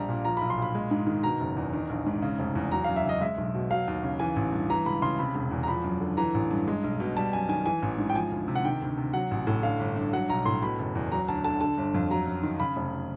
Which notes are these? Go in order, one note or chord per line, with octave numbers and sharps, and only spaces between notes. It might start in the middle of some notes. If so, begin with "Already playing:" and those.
Already playing: A#1 G3 A#5
A#2
F3 A#5
B1 B5
C6
A#2 B5
G#3
G#2
D#3
B2 A#5
F#1
E2
D#3
A#1
G#2
C#3
F1
E2
F#3 A#5
F#2 F5
E5
C#3 D#5
G#3 E5
B1
B2
F#3 F5
D#2
C#3
E3 G#5
A1
G2
E3 A#5
C#2 B5
C#3 C6
C3 B5
E1
E2
A#5
F3 B5
F#2
D3
E3 A#5
A1
G2
G#3
B1
B2
G3 A5
F#2 G#5
D#3 G#5
E3 G#5
A1
G#2
G5
F3 G#5
D2
C3
F#5
D#3 G5
D2
C3
F#3 F#5
A1
A2
D3 F5
G1
G2
F#3 F#5
B1 A#5
A2 C6
B2 B5
F#1
E2
F#3 A#5
D2 A5
D3 A5
D3 A5
G1
F2
F#3 A#5
F#2
D#3
C#3 B5
F1